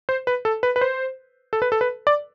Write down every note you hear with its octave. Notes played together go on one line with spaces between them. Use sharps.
C5
B4
A4
B4
B4
C5
A4
B4
A4
B4
D5